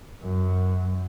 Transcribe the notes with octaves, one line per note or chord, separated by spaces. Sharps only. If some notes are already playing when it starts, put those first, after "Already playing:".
F#2